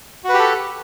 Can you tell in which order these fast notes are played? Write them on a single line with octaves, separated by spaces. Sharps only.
F#4 B4 G4 A4